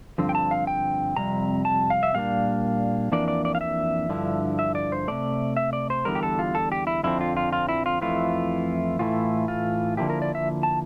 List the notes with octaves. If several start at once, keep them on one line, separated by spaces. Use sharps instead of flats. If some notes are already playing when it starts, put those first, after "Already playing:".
G2 D3 F3 C4
G5
A5
F5
G5
F2 C3 G3 A#5
A5
F5
E5
A#2 G3 A#3 D4 F5
F2 E3 A#3 D4 D5
D5
D5
F5
E5
G2 D3 F3 E4
E5
D5
C5
C3 E3 A3 D5
E5
D5
C5
E2 D3 G3 A#4
G4
A4
F4
A4
G4
E4
F2 D3 F3 C4 E4
F4
F4
F4
E4
F4
F2 E3 A3 E4 F4
A2 E3 A3 E4 F4
F4
D3 F3 A#3 E4 G4
A#4
D5
E5
A5